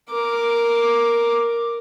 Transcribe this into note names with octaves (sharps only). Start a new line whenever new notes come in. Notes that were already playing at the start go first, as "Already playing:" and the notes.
A#4 D6